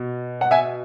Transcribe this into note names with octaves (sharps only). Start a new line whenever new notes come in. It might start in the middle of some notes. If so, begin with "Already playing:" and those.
Already playing: B2
F#5
E5 G#5